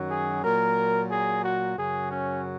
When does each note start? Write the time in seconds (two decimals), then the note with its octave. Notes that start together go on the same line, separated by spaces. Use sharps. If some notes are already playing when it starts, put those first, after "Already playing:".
Already playing: F#2 D#3 F#3
0.10 G#4
0.43 A#2 F#3 A#4
1.10 G#4
1.44 F#4
1.77 F#2 C#3 F#3 G#4
2.10 C#4